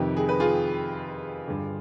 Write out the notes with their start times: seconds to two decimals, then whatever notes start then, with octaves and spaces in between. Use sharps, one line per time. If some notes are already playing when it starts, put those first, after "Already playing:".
Already playing: F2 C3 D#3 G4 B4
0.17 G#4
0.29 B4
0.40 F4 G#4
1.48 G2 D3